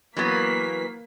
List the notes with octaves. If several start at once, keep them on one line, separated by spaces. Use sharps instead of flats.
E3 F#3 A#3 B3 B6